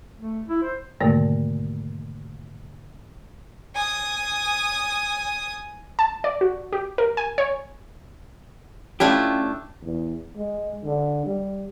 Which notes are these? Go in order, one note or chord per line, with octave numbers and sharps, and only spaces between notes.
A3
E4
C5
G#2 B2 D3 D#3 A3 A#3
G#5 D#6
A5
D5
F#4
G4
A#4
G#5
C#5
A3 C#4 D4 E4 F4 G4
E2
G#3
D3
G3